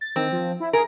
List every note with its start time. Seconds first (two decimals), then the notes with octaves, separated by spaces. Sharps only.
0.01 A6
0.16 D#3 C4
0.32 F3
0.60 E4
0.73 G#4 A#4